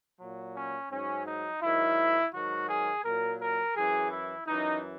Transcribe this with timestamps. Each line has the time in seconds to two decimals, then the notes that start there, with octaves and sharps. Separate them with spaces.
0.20 A#2 F#3
0.55 C#4
0.90 G#2 F#3 C#4
1.26 D#4
1.62 G#2 D#3 F#3 E4
2.33 G#2 D#3 F#3 F#4
2.69 G#4
3.04 A#2 F#3 A#4
3.40 A#4
3.76 F#2 E3 G#4
4.11 E4
4.47 F#2 E3 D#4